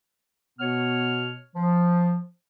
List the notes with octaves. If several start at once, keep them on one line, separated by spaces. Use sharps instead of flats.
B2 B3 C#5 F6
F3